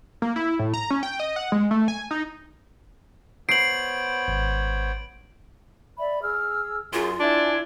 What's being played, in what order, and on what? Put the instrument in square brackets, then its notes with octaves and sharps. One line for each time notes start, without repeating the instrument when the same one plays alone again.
[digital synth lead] A#3
E4
A2
A#5
C#4
G5
D#5
F#5
G#3
A3
G#5
D#4
[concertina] B3 C5 C#5 [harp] C7 [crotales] D7 F#7
[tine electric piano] G#1
[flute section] D5 E5 B5
G#4 E6 F6
[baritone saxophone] F#2 [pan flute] F4 [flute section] G#4
[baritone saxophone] D4 [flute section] E4 G#5 G#6